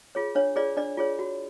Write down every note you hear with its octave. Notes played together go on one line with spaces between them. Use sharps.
F4 G#4 C#5
D4 C#5
F4 G#4 C#5 D5
D4 D5
F4 G#4 C#5
F#4